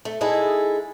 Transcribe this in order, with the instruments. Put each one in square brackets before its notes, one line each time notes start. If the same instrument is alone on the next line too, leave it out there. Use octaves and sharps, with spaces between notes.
[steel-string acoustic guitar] A3
G#3 D#4 E4 G#4 A4